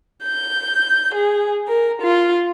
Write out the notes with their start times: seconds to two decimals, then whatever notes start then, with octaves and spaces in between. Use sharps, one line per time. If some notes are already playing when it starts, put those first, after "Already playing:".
0.23 G6
1.14 G#4
1.67 A#4
2.01 F4